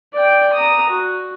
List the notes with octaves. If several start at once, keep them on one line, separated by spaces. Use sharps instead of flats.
D5 G5
A#5 D#6
F#4